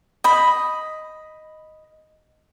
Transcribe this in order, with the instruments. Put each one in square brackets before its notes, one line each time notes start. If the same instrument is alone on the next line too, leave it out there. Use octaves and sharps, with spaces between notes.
[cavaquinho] D#5 B5